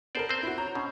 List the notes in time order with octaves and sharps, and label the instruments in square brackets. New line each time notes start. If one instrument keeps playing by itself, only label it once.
[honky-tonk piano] B3 A4 A#4 [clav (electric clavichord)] C5 D5
[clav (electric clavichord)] C4 C5
[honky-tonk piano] E4 F#4
C#5 A#5 G6
[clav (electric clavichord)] B2 [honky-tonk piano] C#4